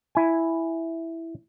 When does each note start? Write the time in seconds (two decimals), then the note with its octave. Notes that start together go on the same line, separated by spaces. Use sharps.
0.15 E4 G#5